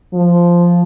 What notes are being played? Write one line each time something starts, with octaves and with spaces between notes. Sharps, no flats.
F3